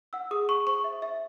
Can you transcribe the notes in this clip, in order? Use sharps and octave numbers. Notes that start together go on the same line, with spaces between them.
F#5 E6
G#4 D#6
G#4 C#6
C5 C#6
E5
E5